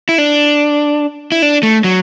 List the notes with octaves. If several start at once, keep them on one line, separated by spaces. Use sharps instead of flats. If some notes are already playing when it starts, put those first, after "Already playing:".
E4
D4
E4
D4
A3
F#3